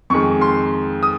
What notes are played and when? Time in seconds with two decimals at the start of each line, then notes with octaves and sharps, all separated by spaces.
0.10 F2 D#3 G#3 C#6
0.41 C6
1.03 D#6